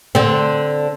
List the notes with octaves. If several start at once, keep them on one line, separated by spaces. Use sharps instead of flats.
D3 C4